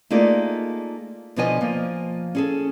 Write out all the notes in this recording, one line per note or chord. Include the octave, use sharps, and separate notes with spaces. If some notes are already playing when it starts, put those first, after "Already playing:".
A3 A#3 D#4 F4 G#4 D5
B2 D3 F3 C#5 D#5 G#5
F3 A#3
C#4 G#4 A4